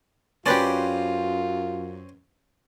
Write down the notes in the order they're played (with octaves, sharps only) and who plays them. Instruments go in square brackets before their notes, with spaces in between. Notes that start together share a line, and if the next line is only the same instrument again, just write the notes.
[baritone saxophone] F#2 [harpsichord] C4 C#4 [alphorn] F4 [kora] G4 B4 D5